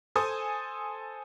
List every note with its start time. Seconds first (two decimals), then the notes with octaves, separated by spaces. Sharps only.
0.16 A4 C5 G#5 D#6